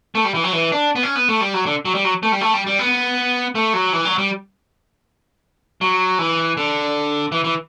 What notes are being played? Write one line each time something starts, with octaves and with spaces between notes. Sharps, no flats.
A3
G3
E3
F#3
E3
D4
B3
C#4
B3
A3
G3
F#3
D3
F#3
G3
F#3
A3
G3
A3
G3
G3
B3
A3
F#3
E3
F#3
G3
F#3
E3
D3
E3
E3